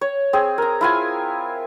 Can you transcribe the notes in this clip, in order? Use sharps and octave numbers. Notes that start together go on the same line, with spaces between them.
C#5
C4 G#4
A#4 A#5
E4 F4 G#5